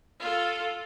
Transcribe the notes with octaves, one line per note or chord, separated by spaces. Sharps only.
F4 A4